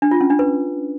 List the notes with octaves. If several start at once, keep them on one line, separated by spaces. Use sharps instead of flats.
D4
F4
C#4
D4
B4